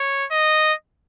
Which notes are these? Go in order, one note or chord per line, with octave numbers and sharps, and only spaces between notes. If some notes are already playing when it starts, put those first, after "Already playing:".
Already playing: C#5
D#5